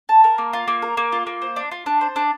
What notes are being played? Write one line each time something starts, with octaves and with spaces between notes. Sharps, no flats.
A5
A#4
A#3
F4
A#3
A#4
A#3
F4
A#3
C5
D4
F4
D4
C5
D4